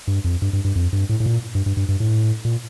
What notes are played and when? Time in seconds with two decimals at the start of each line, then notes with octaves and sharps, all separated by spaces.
0.07 G2
0.24 F2
0.42 G2
0.53 G2
0.64 G2
0.75 F2
0.93 G2
1.09 A2
1.20 A2
1.26 A#2
1.55 G2
1.66 G2
1.77 G2
1.89 G2
2.00 A2
2.45 A#2